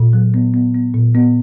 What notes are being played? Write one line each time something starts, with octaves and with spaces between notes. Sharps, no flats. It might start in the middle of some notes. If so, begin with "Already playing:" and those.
Already playing: A#2
F#3
B3
B3
B3
A#2
B3